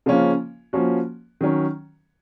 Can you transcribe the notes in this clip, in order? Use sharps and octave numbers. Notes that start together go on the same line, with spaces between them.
C#3 F3 A#3 C#4 F4
F3 A#3 C#4 F#4
D#3 F#3 C#4